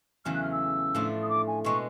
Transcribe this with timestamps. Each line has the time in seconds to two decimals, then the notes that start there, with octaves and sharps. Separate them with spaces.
0.25 E2 C#3 F#3 A3 C#4 F6
0.34 F#6
0.42 F6
0.52 E6
0.95 A2 F3 A3 D4
1.22 D#6
1.29 D6
1.47 G#5
1.64 B2 G#3 B3 C#6